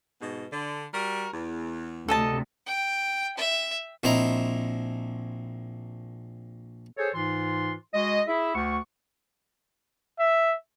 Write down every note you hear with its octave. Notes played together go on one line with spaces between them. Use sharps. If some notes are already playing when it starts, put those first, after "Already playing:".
G#2 B2
D3
G3 F#4 A#4
E2
D2 C3 A4 D#5 A5
G5
E5
A#1 C4 E4 C5 D#5 A#5
G#4 A4 C5 C#5
G#2 E3 F4 C6
G#3 F#4 D#5
E4 G#4 E5
D2 F#5 C#6
E5